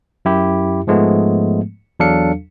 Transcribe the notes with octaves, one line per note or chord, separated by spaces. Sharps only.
F#2 E4 G4
G#2 F3 G#3 A3 B3
E2 F#3 D4 A4 F5 C#7